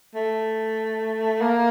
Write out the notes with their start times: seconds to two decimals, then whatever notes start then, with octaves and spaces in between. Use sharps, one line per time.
0.15 A3
1.41 A#3